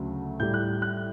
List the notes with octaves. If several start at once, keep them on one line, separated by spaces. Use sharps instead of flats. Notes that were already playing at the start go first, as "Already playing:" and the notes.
Already playing: D2 C#3 F#3 A3
A2 G3 G6
F#6
F#6